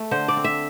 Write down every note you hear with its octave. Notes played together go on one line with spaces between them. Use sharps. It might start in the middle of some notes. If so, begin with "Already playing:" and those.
Already playing: A3 A4
D3 C5
D5
C4
E5